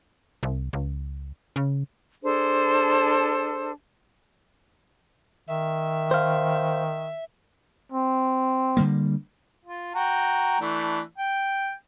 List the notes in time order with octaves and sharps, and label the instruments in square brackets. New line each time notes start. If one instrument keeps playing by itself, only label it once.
[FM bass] C2
C#2
C#3
[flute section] D4 G#4 A4 C5
[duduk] D#3 [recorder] E5
[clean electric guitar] C5 F5
[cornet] C4
[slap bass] D3 G3 A#3
[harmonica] F4
F#4 G5 A#5
E3 A3 D4
G5